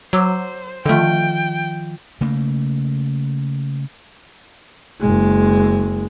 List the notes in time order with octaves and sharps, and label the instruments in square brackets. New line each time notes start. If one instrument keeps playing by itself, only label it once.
[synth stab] F#3 [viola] C5 [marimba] D6 E6
[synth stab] D3 A3 [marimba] D#3 F3 F4 [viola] G5
[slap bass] C#3 A3 A#3
[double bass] F#1 G#3